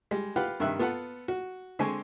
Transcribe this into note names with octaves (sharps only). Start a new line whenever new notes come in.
G3 G#3
F4 G4 B4 F5 F#5
G2 C3 D#3 E5 F#6
B3 F4 A4 B4 F#5
F#4
D3 G#3 C4 G#5 C#6